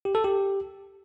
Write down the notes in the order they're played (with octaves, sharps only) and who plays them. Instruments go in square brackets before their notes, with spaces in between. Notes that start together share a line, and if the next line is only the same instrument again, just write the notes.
[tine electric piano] G4
A4
G4